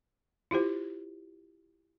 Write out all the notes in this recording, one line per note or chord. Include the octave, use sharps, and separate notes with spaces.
E4 F4 G4 C5